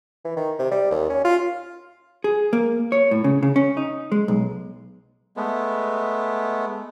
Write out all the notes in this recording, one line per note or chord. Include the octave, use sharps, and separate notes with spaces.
E3
D#3
C3
G3
D#2
C#4
F4
G#4
A#3
C#5
A2
C#3
C#3
C#4
D#4
G#3
B1
G#3 A3 B3